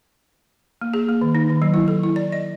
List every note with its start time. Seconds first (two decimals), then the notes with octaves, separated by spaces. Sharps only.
0.81 A#3
0.94 G#4
1.09 A#3
1.21 D#3
1.35 D#4
1.50 D#3
1.62 F#3
1.74 E4
1.88 A4
2.03 E4
2.16 D5
2.32 D#5